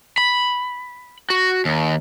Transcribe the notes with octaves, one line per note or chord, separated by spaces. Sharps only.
B5
F#4
D#2